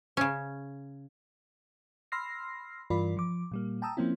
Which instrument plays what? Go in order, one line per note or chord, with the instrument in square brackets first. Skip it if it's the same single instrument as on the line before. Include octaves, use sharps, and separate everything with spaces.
[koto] C#3 C#4
[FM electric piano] B5 C6 E6 F6 A#6 C7
G2 E3 F4 A#4 D5 B5
F3 D6
A#2 G3 A#3
G5 A5 A#5 D#6 E6
F3 A#3 C4 C#4 E4